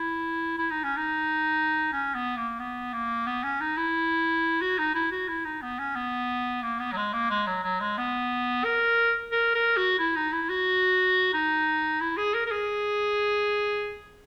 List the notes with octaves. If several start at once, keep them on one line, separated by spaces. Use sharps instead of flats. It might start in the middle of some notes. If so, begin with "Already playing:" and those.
Already playing: E4
E4
D#4
C#4
D#4
C#4
B3
A#3
B3
A#3
B3
C#4
D#4
E4
F#4
D#4
E4
F#4
E4
D#4
B3
C#4
B3
A#3
B3
F#3
G#3
A#3
G#3
F#3
F#3
G#3
B3
A#4
A#4
A#4
F#4
E4
D#4
E4
F#4
D#4
E4
G#4
A#4
A#4
G#4